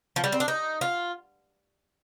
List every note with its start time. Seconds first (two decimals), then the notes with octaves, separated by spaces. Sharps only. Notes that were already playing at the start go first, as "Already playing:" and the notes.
0.16 F3
0.24 G3
0.32 C4
0.40 D4
0.48 D#4
0.81 F4